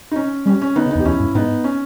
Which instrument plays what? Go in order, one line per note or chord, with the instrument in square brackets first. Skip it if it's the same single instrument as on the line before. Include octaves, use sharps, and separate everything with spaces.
[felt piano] D#4
C#4
[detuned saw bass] G3 [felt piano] C#4
[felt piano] C#4
[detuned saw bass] D#3 [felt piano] B3 D#4
[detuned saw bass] C#3
[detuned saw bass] E2 [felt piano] B3 D#4
[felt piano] G4
[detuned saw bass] E2 [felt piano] C#4 E4
[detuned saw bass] G2
[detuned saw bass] G#2 [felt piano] B3 D#4
[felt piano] C#4